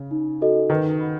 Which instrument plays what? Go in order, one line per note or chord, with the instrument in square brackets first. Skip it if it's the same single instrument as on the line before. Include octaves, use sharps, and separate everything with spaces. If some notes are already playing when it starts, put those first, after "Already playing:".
Already playing: [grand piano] C#3
[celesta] D#4
F#4 A4 D#5
[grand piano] D#3 [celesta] B4
[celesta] F#5 B5